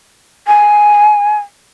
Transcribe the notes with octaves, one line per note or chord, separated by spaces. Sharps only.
G#5